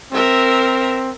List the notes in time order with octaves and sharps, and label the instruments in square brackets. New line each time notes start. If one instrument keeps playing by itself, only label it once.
[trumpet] C4 [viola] A#4 E5